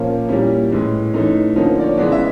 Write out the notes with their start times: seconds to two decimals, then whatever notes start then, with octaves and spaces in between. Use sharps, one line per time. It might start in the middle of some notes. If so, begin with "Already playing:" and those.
Already playing: A#2 F3 A#3 C#4 F4
0.29 A#2 G3 A#3 C#4 E4
0.72 A2 E3 G#3 C#4
1.14 E3 A3 C#4 D#4
1.56 D3 F3 A#3 C#4 D#4
1.80 D5
1.84 C#5
1.97 C#3 E3 G#3 B3 D5
2.12 E5